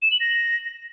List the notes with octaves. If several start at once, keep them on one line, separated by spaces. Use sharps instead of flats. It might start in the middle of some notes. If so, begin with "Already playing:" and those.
E7
F#7
A#6